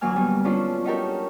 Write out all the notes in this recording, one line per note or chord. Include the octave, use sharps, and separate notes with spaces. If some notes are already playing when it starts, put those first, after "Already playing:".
D2 E3 F#3 A#3 G#5 F6
G3 A#3 B3
F3 C#4 D4 F4 A4
C#4 D#4 F#4 G4 A4 A#4